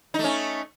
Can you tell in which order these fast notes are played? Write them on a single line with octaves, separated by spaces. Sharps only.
D#4 A3 C#4